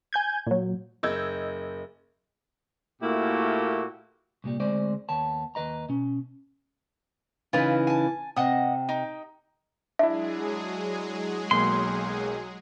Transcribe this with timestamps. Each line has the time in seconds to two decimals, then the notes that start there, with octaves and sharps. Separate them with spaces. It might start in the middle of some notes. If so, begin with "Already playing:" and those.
0.13 G#5 G6 G#6
0.47 A#2 F#3
1.03 F#1 D#5 E6 G6 G#6
3.02 A#2 A3 A#3 E4 F#4 G4
4.44 C2 A#2 G3
4.60 D2 G#3 C4 C5 D5
5.09 D#2 B3 C#5 A5
5.55 D#2 B4 D#5 A#5
5.89 B2 C#4
7.53 C#3 E3 D#4 F4 B4
7.87 G#5 A5
8.36 C3 D#5 F#5 D#6
8.89 D#4 G5
9.99 F#3 G#3 D4 E4 G#4 E5
11.51 B1 A#3 C6